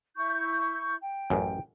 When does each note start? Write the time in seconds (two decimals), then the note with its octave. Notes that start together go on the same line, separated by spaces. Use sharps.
0.17 E4 C#6 G6
1.01 G5
1.30 A1 F#2